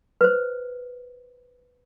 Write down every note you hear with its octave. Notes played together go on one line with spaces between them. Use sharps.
B4 C5